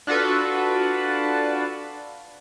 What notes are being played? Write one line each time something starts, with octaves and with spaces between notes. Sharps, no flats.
D4 F4 F#4 A4 B4